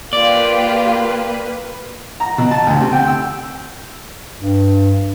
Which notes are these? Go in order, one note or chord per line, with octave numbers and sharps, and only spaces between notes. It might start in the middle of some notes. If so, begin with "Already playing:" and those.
A#3 F4 G4 B4 D5 F5
A#5
B2
A5
D2
C3
G5
E6
G2